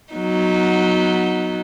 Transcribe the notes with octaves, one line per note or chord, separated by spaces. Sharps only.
F#3 B3 D#4